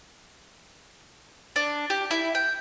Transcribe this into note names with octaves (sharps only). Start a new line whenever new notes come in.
D4
G4
E4
G5